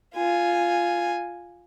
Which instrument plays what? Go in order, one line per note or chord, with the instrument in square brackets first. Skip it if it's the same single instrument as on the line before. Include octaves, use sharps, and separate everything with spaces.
[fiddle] F4 G#5